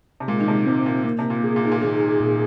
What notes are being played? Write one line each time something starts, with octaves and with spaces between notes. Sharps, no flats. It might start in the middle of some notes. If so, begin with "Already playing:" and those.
C3
A#2 G#3
D#3
C3
G#2 C4
A#2
A#3
C3
A#2
G#4
A#2
G#2
A#2
D#3 G#4
A#2